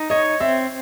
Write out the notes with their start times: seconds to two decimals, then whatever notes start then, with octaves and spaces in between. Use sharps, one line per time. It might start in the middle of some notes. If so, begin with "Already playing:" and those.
Already playing: D#4
0.10 C#5 D#5
0.40 C4 E5